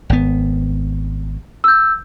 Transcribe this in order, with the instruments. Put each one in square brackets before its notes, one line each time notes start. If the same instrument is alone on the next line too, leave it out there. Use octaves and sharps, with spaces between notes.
[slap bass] G#1 B3
[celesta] E6 G6